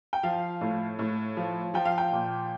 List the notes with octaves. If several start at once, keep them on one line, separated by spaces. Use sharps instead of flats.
G5
F3 F5
A2
A2
F3
F3 G5
F5
G5
A#2